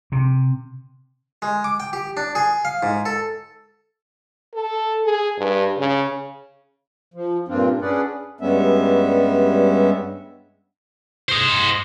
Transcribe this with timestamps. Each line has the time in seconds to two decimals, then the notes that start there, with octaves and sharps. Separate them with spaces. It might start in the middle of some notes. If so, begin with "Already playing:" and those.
0.12 C3
1.42 G#3
1.64 D6
1.80 G5
1.93 G4
2.17 D4
2.35 G#4
2.65 F5
2.83 G#2
3.06 A4
4.54 A4
5.05 G#4
5.38 G2
5.77 C#3
7.14 F3
7.49 G2 A#2 C4 D4 F4
7.82 C#4 D4 G#4 B4 D5 F#5
8.41 G2 G3 G#3 B3 C#4 E5
11.29 C5 D#5